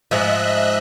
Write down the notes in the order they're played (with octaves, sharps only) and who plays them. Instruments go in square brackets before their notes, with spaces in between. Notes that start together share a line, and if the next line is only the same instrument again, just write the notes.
[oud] G#2 F3 [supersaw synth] D#5 E5 F#6